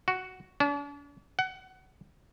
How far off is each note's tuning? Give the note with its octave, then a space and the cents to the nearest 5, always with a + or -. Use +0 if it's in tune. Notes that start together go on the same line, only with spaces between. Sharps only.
F#4 +5
D4 -45
F#5 +20